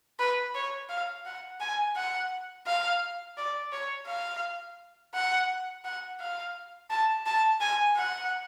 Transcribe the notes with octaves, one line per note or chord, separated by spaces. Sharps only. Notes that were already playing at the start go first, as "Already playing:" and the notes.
B4
C#5
F5
F#5
G#5
F#5
F5
D5
C#5
F5
F#5
F#5
F5
A5
A5
G#5
F#5